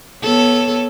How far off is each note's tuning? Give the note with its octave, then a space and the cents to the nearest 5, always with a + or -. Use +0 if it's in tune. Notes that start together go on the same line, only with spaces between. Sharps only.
B3 -25 A4 +0 C#5 +0